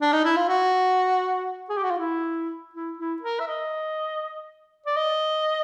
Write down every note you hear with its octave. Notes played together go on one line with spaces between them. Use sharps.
D4
D#4
E4
F4
F#4
G#4
G4
F#4
F4
E4
E4
E4
A#4
E5
D#5
D5
D#5